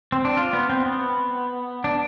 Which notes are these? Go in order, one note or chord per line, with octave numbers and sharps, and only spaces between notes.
C4
D4
F4
B3
C4
B3
D4